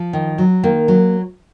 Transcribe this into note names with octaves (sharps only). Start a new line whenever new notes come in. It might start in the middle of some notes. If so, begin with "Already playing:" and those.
Already playing: F3
D#3
F#3
D#3 A#3
F#3